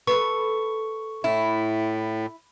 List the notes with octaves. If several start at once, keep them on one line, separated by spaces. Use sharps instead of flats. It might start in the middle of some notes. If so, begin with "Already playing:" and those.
A4 B4 C#6
A2 E4